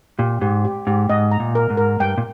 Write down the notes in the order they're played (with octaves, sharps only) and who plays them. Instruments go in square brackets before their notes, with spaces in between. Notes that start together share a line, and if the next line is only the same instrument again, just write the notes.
[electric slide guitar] A#2 [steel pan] G4
[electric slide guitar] G#2 [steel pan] G4
[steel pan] G4
[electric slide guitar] G#2 [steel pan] G4
[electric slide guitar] G#2 [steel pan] D#5
[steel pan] A#5
[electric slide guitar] A#2
[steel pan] A#4
[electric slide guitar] G#2
[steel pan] A#4
[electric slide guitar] G2 [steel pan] G5
[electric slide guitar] A#2